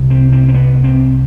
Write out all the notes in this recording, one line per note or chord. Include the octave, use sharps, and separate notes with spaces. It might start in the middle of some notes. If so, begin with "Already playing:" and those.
Already playing: C2 C3
C4
C4
C4
B3
C4